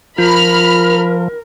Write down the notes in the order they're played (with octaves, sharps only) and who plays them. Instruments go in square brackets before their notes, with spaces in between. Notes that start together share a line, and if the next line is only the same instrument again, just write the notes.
[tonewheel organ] F3 [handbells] F4 [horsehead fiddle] A#4 [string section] B5 F6